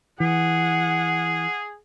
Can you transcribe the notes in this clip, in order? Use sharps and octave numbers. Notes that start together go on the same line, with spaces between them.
E3 G#4 F#5